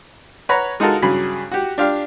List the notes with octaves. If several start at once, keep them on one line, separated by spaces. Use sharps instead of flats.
B4 C#5 F#5 A#5 B5
G#3 D#4 F4 F#4 A4 A#4
G2 C#3 F#3 G#4 B5
F#4 G4
D4 F4 G4 F5